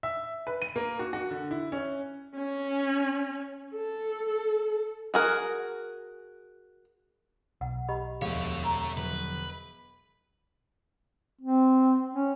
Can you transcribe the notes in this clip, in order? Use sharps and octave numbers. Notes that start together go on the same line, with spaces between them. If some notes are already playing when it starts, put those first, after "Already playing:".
E5
B4
D#7
A#3
F#4
F#4
D3
E4
C#4
C#4
A4
F#4 G#4 A#4
B1 F#5
G4 D#5 B5
E1 D2 F3 A3 C#5 F5
A#5
D3 F3 F#3 B4
C4
C#4